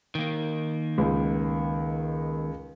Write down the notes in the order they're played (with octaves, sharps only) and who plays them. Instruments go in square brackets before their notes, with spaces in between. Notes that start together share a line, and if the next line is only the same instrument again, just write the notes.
[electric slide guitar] D#3 A#3
[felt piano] C#2